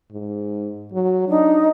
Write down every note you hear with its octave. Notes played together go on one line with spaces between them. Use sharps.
G#2
F#3
D4 D#4